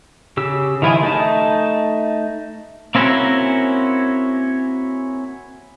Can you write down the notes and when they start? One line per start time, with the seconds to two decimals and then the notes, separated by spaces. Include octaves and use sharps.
0.37 C#3 G4 E6
0.82 D#3 F3 E4 F4 G#4
1.03 A3 D#4 A5
2.95 A#3 C4 C#4 E4 F#4 A#4